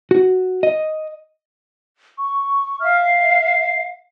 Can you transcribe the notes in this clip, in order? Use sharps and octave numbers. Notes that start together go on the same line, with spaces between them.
F#4
D#5
C#6
E5 F5 F6
C7